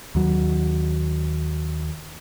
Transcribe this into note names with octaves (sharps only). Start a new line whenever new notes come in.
D#2 F#3